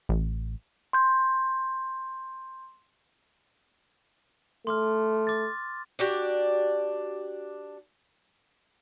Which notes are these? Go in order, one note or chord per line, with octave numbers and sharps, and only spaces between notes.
A1
C6 G6
A3 C6 D6 F6
D6 A6
D4 F#4 G4